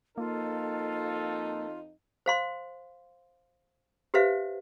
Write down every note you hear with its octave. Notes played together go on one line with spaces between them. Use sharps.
F2 A#3 D#4 F4 A4
C5 F5 C6
G4 B4 C5 E5 F5